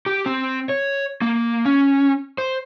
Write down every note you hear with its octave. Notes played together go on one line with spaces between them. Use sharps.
G4
C4
C#5
A#3
C#4
C5